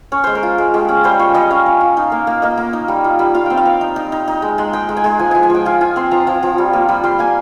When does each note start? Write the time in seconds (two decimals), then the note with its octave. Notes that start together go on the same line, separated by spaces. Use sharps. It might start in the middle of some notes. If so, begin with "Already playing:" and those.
0.12 C#4 C#5
0.24 G#3 C5
0.35 A#4
0.43 F4
0.58 G#3
0.74 G#3 G4
0.88 C#4 G#4
1.04 G3 C5
1.19 F4 C#5
1.34 G3 D#5
1.50 C#4 F5
1.66 C#4
1.81 F4
1.97 D#4
2.12 A#3
2.27 A#3
2.42 A#3 D#5
2.57 A#3
2.73 D#4
2.88 G3
3.04 F4
3.19 G3
3.34 F4 F5
3.46 C4 G5
3.57 F5
3.65 C4
3.81 D#4
3.96 D#4
4.12 D#4
4.28 D#4
4.42 G#3
4.58 G#3
4.73 D#4 G5
4.89 G#3
4.97 G#5
5.04 G#3
5.19 F3 G#5
5.31 F3 G#5
5.43 G#5
5.50 F3 G5
5.65 F4 G#5
5.81 F4 G#5
5.96 C4 C6
6.11 F3 A#5
6.27 F3
6.43 F3
6.58 G3
6.73 A#3
6.89 G3
7.03 G3 C6
7.19 A#3 G#5